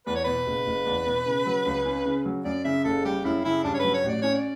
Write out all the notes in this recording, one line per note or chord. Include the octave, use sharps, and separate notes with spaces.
E2 B4
C#5
B2 B4
F#1
F#1
E2
B2
C#3
F#3
C#2
C#4
C#3
F#3
F#2 D5
C#3 E5
F#1 A4
G3 G4
F#2 E4
C#3 E4
G2 D4
C#5
F#3 B4
C#5
A1 D5
C#4 C#5
D5